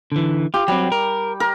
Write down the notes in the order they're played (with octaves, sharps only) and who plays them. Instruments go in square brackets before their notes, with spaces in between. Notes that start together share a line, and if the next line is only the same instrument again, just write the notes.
[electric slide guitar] D3 E3
[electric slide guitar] F4 [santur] G4
[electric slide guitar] F#3 C4 [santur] G3
[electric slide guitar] A#4
[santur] A#4